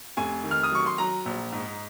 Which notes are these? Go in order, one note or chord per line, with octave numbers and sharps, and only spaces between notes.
F1 G#5
D#3
F6
D#6
F#3 C#6
C6
F#3 A#5
A#1
G#2